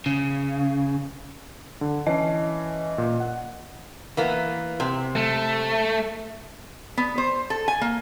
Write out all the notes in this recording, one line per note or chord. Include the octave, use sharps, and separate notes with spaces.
C#3
D3
E3 C#4 D#5
A#2
F#5
E3 A#3 B3
C3
A3
B3
C5
A4
G#5
A#3